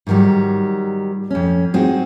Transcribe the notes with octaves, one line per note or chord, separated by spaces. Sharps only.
G#2 D3 D#3 F#3 G3
F2 C#4
G#3 C4 D#4 F#4